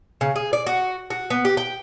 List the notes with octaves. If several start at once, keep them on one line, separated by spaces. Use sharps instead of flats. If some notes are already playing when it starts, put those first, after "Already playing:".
C#3
G#4
D5
F#4
F#4
B3
G4
G5